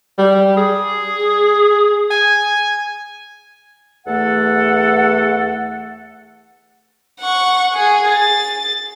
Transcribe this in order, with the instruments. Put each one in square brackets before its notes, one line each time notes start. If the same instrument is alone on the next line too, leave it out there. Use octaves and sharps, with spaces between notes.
[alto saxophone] G3
G#4
G#5
[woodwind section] E2 A3 A4 F#5
[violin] F#5 C#6
G#4
A6